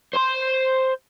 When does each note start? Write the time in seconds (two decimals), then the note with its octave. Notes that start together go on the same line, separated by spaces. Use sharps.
0.14 C5 C6